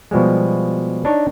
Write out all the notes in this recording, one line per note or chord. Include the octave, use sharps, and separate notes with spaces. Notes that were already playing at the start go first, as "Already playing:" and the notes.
B2 F3 G3 G#3
D4 D#4 C#5